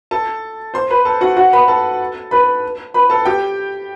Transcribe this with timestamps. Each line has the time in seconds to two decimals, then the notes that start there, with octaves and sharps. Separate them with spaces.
0.11 A4 A5
0.74 C5 C6
0.90 B4 B5
1.05 A4 A5
1.21 F#4 F#5
1.37 F#4 F#5
1.53 B4 B5
1.68 A4 A5
2.31 B4 B5
2.94 B4 B5
3.10 A4 A5
3.25 G4 G5